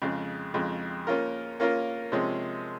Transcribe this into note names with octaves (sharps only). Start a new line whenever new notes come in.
F2 C#3 G#3
F2 C#3 G#3
A#3 C#4 F4 A#4
A#3 C#4 F4 A#4
C3 F3 G#3 C#4